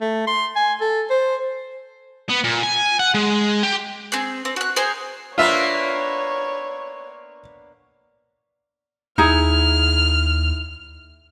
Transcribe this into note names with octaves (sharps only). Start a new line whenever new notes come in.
A3
C6
G#5
A4
C5
B3
A#2
G#5
F#5
G#3
G4
C4 G#4 G6
C4
F#4 F#6
G#4 C5 G#5 A#5
A#3 B3 D4 F4 C#5 E5
D#2 D#4 E4 G#4 F6